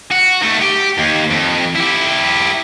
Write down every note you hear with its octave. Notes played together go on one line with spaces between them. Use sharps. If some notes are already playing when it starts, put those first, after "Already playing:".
F#4
D#3 A3
G4
D#2
F2
E4 G4